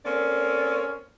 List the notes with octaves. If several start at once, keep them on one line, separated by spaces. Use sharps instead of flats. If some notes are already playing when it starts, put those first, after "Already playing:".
A#3 C4 C#4 A4 D5